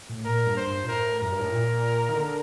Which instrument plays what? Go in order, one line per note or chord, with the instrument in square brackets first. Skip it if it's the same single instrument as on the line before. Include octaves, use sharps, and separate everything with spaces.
[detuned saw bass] A2
[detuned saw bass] A#2 [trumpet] A#4
[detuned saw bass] G2
[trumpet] C5
[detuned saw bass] G2
A#2
[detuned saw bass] A2 [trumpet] A#4
[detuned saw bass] F#2 [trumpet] A#4
[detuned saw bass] G2
A2
A#2
D#3
D3